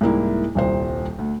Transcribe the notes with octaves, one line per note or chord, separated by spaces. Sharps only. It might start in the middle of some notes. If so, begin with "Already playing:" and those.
C2 G#2 A#3 E4
D#1 C2 C5
D2